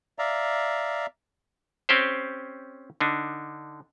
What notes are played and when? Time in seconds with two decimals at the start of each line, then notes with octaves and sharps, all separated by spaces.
0.19 D5 E5 F5 A#5
1.89 C4 C#4 G4 C5
3.00 D3 D4 D#4